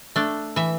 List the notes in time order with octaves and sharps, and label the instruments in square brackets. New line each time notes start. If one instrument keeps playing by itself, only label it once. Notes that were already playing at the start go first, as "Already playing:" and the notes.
[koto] A3 D4
E3 E5